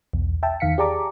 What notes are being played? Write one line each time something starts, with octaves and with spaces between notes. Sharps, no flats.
B1 E2
E5 G5 A5
E2 D#3 F5 B6 C#7
G4 G#4 D5 A5 A#5 D6